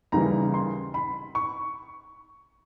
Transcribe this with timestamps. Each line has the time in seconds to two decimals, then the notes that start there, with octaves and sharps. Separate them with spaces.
0.12 D#2 C#3 E3 G3 A#5
0.54 C6
0.94 B5
1.35 C#6